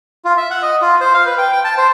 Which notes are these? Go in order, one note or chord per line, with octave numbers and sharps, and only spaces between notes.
F4
E5
F#5
D#5
F4
C5
F5
B4
G5
G5
A5
C5